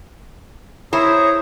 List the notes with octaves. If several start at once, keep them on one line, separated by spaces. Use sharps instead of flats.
E4 G#4 C5 C#5 A#5